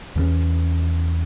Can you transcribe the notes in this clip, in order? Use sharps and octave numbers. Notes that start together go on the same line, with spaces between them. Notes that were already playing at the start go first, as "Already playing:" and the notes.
E2 E3 G3 C#4